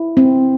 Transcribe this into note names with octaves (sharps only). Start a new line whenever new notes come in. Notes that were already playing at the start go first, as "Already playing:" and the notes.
Already playing: E4
C4